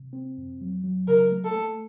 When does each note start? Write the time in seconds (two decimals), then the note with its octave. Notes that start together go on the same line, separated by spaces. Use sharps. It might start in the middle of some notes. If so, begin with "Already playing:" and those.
Already playing: C3
0.13 C4
0.37 F2
0.61 F#3
0.84 F#3
1.08 C#3 A#4
1.32 A3
1.44 A4
1.55 A3